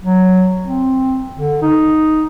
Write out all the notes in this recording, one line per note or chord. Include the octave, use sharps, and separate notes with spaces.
F#3
C4
D3
D#4